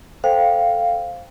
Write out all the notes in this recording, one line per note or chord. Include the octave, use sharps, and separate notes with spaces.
A4 C5 F5 G5